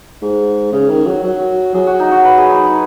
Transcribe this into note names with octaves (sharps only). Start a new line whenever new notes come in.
G#2
C#3 C#5
D#3
F#3
F#3
F#3 G#4
F#4
D#4
F#4
B4
G#4
D#4
D#4